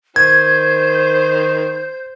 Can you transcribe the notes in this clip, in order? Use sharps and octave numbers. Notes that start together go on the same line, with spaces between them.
D#3 C5 G6 G#6